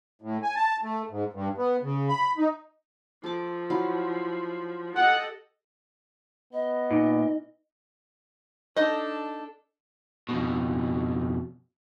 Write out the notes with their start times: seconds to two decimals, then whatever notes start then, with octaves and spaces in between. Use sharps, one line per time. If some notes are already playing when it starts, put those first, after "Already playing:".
0.22 A2
0.43 G#5
0.55 A5
0.83 A3
1.10 G#2
1.33 G2
1.58 B3
1.82 C#3
2.09 B5
2.38 D#4
3.24 F3 A4 D6
3.70 F#3 E4 F5
4.96 G4 A4 D#5 F#5 G5
6.53 B3 D#5
6.91 A#2 D#4
8.76 D4 D#4 A4 D#5
10.29 F2 B2